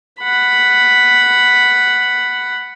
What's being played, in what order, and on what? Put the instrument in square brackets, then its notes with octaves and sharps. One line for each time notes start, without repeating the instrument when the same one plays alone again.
[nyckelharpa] F#5 B5